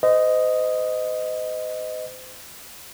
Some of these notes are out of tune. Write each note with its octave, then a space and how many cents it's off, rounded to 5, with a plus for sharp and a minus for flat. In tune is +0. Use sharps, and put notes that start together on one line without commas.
C5 -35 D#5 +0